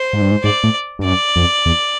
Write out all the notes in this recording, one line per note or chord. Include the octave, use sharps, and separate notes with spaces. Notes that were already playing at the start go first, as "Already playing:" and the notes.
Already playing: C5
G#2
G2
G#2
G#2 D5
A2
G2
F#2 D5
F2
E2